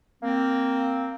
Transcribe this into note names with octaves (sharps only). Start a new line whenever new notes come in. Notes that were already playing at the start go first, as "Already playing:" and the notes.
A#3 C4